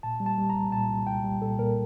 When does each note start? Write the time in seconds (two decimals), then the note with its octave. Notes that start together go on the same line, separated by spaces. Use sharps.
0.03 A#2 A5
0.20 G3
0.26 A5
0.38 G3
0.50 A#5
0.56 C2
0.72 A#2 A5
0.89 C2
1.07 C2 G5
1.24 G3
1.42 A#2 A4
1.59 A#2 A#4